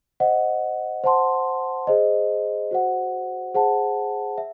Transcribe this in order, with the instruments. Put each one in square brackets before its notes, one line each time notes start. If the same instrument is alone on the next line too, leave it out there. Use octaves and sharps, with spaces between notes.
[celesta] C5 D#5 F#5
C5 F#5 A5 C6
G#4 C5 D#5
F#4 C5 F#5
G#4 C5 F#5 A5
E5